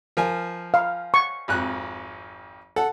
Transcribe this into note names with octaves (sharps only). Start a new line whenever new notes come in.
F3 A#4 G#5
F5
C#6
G#1 F2 F#6
A4 F#5